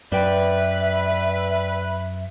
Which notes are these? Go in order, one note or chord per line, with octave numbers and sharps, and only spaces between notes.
F#2 B4 D5 E5 G5